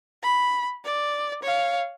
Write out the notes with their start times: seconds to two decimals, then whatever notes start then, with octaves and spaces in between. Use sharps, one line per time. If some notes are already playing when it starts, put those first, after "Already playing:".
0.23 B5
0.85 D5
1.43 C#5 F5